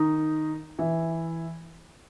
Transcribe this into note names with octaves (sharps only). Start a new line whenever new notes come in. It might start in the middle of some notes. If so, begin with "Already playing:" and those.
Already playing: D#3 D#4
E3 E4